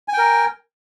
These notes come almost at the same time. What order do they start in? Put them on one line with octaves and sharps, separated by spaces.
G#5 G5 A#4